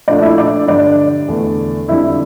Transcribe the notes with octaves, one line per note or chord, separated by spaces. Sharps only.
A#2 F3 A3 D4 D5
E4 E5
D4 D5
G2 D3 G3 D4 D5
E2 D3 A3
F2 D3 G3 E4 E5